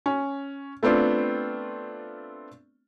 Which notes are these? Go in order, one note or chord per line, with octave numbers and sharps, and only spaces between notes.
C#4
A3 B3 C4 D4 F4